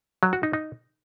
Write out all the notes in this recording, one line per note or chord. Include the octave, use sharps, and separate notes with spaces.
F#3
F#4
D#4
D#4